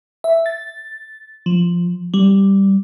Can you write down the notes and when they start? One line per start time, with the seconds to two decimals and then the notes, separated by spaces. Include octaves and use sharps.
0.24 E5
0.46 A6
1.46 F3
2.14 G3